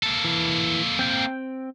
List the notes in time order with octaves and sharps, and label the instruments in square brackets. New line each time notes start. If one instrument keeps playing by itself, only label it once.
[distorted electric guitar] A#3 A4
[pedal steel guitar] E3
C4 G5